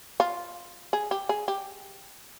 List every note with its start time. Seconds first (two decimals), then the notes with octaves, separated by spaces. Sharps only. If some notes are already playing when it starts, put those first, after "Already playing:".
0.20 F4
0.93 G#4
1.11 G4
1.29 G#4
1.48 G4